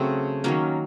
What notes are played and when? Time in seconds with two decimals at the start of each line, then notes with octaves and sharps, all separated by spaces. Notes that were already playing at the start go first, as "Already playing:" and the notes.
Already playing: C#3 F#3 A3 C4
0.44 D#3 F#3 A#3 C#4